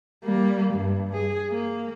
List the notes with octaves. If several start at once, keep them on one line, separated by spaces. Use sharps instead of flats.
G3 A#3
G2
G#4
A#3